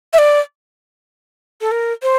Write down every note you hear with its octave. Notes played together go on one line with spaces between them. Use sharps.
E5
D5
A4
A#4
C5